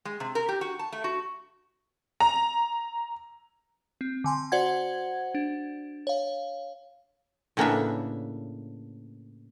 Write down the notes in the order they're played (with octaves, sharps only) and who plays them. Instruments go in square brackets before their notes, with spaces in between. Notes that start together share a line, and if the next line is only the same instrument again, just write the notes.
[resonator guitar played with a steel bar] G#3
C3
A#4
G4
F#4
A5
A3
F#4
[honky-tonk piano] A#5
[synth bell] C4
D3 G#5 C6
F#4 C5 D5 F#5 G#6
D4
C#5 F5
[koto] A2 C#3 A#3 B3 D4 E5